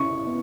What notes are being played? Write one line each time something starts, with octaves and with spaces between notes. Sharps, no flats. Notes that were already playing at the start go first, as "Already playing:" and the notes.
Already playing: E4 C#6
B3